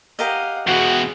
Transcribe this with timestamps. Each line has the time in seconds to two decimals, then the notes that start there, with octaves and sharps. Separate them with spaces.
0.19 G4 A#4 D#5 F5 F#5
0.67 E2 B2 G#3 F#4